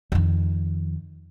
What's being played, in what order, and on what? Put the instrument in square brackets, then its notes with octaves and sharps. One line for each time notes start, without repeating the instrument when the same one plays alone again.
[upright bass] F2 D#3